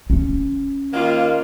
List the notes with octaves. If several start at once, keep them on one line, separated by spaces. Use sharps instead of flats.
C#4
D#2 D#3 A#3 F4